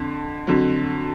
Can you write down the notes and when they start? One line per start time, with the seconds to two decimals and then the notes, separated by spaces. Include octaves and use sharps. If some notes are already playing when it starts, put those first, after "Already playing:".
Already playing: F2 D3
0.47 F2 D3 F#3